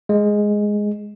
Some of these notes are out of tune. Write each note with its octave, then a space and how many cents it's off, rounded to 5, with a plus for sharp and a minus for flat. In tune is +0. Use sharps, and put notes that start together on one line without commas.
G#3 +0